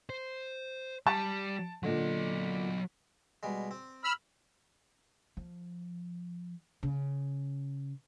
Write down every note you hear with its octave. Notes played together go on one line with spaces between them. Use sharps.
C5
G3 A5
A#2 D3 F#3 D#5
B2 G3 G#3
C4
B5 E6 F6
F3
C#3